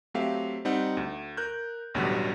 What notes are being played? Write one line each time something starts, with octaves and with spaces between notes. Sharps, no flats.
F#3 A3 C4 G4 E5 F5
G3 C4 D#4 F#5
D2
A#4 F#6 G6
A1 D2 B2 D3 F#3 G3